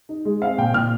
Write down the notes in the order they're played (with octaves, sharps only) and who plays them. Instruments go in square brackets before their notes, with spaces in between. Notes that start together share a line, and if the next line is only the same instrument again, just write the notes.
[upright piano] D#4
G#3
C4 F5
A#2 G5
A#2 F6